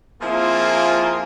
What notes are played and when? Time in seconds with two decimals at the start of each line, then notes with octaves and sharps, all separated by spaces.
0.21 F3 A#3 C4 E4 F4 G#4